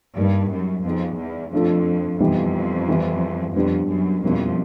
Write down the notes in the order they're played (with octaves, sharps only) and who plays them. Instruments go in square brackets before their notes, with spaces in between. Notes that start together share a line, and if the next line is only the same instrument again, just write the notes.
[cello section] G2 [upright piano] G3 A#3 D#4
[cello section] F#2
[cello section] F2 [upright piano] B3 D#4 G#4
[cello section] E2
[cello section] F2 [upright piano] A3 D4 F4 A4
[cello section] F2 [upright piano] E3 G3 B3 D#4
[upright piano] E3 G3 B3 E4
[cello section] F2 [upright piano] G3 B3 D4 G4 B4
[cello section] F#2
[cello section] F2 [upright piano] B2 G3 A#3 C#4 E4